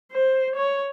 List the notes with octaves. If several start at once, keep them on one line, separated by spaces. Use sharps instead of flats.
C5
C#5